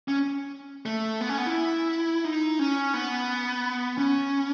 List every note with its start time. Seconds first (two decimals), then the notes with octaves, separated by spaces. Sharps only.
0.08 C#4
0.86 A3
1.21 B3
1.29 C#4
1.38 B3
1.46 E4
2.24 D#4
2.59 C#4
2.94 B3
3.98 C#4